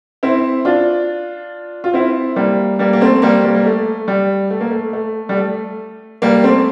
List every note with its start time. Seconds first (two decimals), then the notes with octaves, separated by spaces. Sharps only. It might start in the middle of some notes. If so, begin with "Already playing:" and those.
0.23 C4 E4
0.65 D4 F4
1.84 F4
1.93 C4 E4
2.36 G3 A#3
2.79 G3 A#3
2.93 A#3
3.01 A3 C4
3.22 G3 A#3
3.44 G3 A#3
3.54 A#3
3.65 A3
4.08 G3
4.50 A3
4.60 A#3
4.71 A3
4.93 A3
5.29 G3
5.37 A3
6.22 G3 A#3
6.44 A3 C4